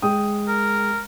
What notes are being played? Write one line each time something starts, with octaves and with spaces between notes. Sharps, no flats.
G#3 G5 D#6
A#4